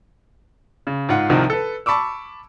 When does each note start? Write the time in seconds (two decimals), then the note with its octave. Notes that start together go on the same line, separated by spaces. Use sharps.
0.87 C#3
1.09 G#2 F4 F#5
1.29 C2 C3 D#3 F3
1.50 A4 B4
1.86 A5 B5 C#6 D6 E6